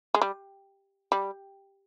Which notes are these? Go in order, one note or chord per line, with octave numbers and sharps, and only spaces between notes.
G#3
G3
G3